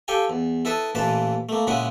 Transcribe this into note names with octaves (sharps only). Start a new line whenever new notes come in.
G4 A4 F5 G5 G#5
E2
E4 A4 B4 A5 D#6
A1 A#2 E3 B4 F5 A5
A3 A#3
A#2 C#3 G#3 E4 F#5 D#6